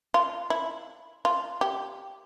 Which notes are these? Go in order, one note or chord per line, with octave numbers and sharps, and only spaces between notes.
F4
E4
F4
G4